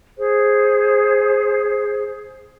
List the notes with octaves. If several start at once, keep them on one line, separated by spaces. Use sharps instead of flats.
G#4 C5